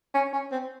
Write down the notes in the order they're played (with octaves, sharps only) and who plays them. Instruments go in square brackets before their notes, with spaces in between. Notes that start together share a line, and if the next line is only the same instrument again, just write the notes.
[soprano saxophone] C#4
C#4
C4